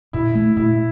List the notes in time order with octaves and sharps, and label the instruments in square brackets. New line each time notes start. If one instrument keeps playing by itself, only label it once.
[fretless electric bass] A#2 [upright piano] E4
[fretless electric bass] A3
[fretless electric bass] A#2 [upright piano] E4